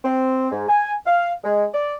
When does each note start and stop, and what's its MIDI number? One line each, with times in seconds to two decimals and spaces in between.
0.04 0.51 60
0.52 0.67 44
0.69 0.93 80
1.06 1.32 77
1.44 1.65 56
1.73 1.96 74